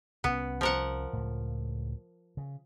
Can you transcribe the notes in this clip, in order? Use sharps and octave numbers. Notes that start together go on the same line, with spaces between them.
C2 B3 C#4
F3 A#4 F#5
C#2 A2
C#3